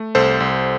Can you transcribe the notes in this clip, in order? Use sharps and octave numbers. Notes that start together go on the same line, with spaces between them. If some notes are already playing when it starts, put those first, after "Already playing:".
Already playing: A3
C2 A4 C5
C2